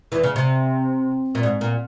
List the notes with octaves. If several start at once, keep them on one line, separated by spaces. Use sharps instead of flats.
E2 E3
C#3
C3
A#2
G#2
A#2